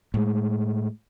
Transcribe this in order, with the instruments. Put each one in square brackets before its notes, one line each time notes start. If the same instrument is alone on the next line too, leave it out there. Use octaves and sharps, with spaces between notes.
[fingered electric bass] A2 G#3